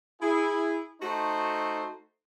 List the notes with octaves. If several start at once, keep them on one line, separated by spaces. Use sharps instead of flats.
E4 G#4
A3 D#4 F#4 A4 C5